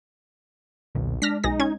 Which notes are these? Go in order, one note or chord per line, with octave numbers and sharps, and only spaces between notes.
B1 E2 A#2 D3
G#3 D4 F6 A#6 B6
B1 D#4 G#4 A#6
C#4 G#6